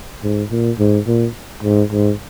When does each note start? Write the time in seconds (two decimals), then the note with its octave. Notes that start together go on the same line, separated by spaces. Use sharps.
0.23 G#2
0.51 A#2
0.79 G#2
1.07 A#2
1.63 G#2
1.92 G#2